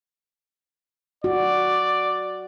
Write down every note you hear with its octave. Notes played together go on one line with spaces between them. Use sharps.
F#4 D5